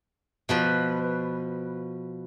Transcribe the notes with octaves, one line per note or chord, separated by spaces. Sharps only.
B2 F3 B4